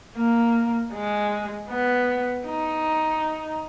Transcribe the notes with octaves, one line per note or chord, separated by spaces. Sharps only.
A#3
G#3
B3
D#4